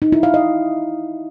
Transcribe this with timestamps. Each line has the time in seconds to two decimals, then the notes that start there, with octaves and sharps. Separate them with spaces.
0.02 D#4
0.12 E4
0.23 F5
0.34 D#5